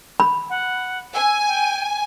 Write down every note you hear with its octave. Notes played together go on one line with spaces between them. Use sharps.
B5
F#5
G#5 E6
G5